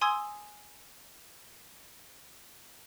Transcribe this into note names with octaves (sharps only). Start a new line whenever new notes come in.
G#5 C6 D#6 E6 G#6